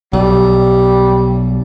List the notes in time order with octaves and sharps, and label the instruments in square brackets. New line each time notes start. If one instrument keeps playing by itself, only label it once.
[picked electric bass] B1 [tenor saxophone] G3